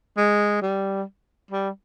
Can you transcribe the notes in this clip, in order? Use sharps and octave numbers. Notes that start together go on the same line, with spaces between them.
G#3
G3
G3